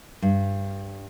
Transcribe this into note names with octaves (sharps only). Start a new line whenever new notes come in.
G2